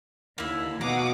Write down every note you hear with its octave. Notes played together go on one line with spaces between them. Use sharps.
D#2 D3 A#3 E4
B2 F#4 F5 F#5 A#5 D6 D#6